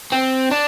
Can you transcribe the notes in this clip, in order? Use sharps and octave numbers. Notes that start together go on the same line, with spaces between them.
C4
D4